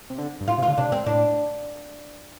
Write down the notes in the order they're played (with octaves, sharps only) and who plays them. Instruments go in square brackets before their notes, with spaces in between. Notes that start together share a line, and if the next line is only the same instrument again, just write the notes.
[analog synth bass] C3
D3
G2
[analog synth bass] A2 [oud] F4
[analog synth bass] C3
[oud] F4
[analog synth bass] D3
[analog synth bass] C3 [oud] D4
[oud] C4
[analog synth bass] A2 [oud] D4